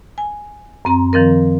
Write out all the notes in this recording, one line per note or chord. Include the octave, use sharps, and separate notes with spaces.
G#5
F#2 C4 A#5
D#3 F3 C4 A#4